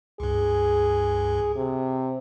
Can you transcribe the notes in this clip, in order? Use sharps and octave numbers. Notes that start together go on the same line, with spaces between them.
C#2 G2 G#4
C3